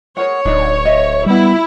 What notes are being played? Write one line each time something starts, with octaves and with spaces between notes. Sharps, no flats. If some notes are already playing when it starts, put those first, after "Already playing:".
G#4 A#4 C#5 F#5
D1 D4 D#4 D5
D#5 E5
G3 B3 E4